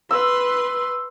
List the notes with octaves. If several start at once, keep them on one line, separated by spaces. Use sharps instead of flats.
B4 C6 E6